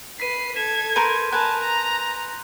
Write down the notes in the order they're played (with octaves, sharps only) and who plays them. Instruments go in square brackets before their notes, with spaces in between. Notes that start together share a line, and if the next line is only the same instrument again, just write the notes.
[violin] B4 C7 [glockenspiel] B6 D#7
[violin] A4 G#6 [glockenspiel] B6 E7
[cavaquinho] A#4 B4 [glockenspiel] C6 G6 D#7
[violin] A#4 A5 [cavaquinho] B4 G#5 [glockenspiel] F#6
[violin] A#5